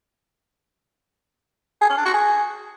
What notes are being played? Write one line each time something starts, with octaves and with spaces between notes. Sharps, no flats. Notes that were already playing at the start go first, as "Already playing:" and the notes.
G#4
C#4
D4
F#4
G#4